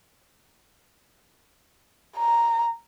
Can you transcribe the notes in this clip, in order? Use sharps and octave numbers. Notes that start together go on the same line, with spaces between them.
A#5